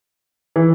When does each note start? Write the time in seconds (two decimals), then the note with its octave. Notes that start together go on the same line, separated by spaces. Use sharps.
0.56 E3